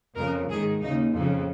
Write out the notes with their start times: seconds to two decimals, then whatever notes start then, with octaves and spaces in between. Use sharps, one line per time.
0.16 F2 C#3 A#4
0.49 G#2 D#3 G#4
0.82 D#2 C#3 D#4
1.14 F2 C#3 F3